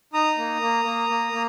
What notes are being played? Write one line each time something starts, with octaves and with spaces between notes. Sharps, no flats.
D#4 A#5 D#6
A#3
A#3
A#3
A#3
A#3